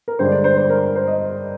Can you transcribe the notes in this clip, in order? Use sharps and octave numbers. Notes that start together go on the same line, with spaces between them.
A#4
G2 D3 G#3 D4 C5
D5
C5
C5
A#4
C5
D#5